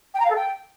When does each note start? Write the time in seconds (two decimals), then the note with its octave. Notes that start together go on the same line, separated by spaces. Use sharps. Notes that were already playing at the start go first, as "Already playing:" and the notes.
0.14 G5
0.19 A#5
0.25 F5
0.30 A4
0.36 G5